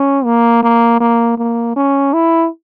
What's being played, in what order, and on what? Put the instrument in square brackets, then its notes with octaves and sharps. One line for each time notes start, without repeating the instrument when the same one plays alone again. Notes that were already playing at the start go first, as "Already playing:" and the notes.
Already playing: [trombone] C#4
A#3
A#3
A#3
A#3
C#4
E4